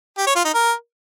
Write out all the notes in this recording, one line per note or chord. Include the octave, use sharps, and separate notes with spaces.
G4
C#5
F4
D#4
A#4